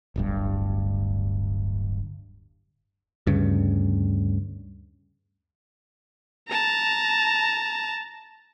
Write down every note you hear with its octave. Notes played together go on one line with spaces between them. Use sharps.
D1 G1 G2
D2 G2 C#3
A5 A#5